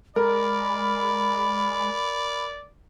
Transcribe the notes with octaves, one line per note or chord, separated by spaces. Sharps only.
G#3 A#4 D5 B5